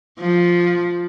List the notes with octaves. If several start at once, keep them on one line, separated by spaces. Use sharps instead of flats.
F3